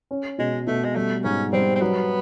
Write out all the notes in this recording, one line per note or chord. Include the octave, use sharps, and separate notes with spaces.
C#4
B2 G#3
B2 A3
G#3
G3 A3
G#2 C#4
G3 C4
C4
F#3 B3